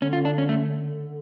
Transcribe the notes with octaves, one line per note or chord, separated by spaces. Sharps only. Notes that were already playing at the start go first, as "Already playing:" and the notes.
D3 C#4
F4
D4
C#4
A3